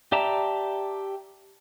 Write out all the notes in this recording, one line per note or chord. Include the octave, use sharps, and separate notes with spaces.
G4 D5 E5 A5 A#5